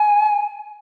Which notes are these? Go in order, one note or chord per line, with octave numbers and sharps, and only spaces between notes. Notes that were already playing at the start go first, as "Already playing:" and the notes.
Already playing: G#5